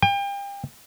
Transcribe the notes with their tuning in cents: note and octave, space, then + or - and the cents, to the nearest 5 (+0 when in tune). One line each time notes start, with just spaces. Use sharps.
G5 +35